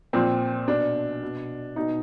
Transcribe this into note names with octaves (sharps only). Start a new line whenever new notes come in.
A#2 F3 C4
B2 D4
B2
B2 D#4